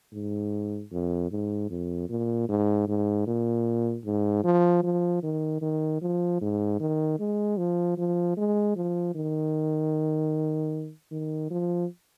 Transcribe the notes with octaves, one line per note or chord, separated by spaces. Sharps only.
G#2
F2
G#2
F2
A#2
G#2
G#2
A#2
G#2
F3
F3
D#3
D#3
F3
G#2
D#3
G#3
F3
F3
G#3
F3
D#3
D#3
F3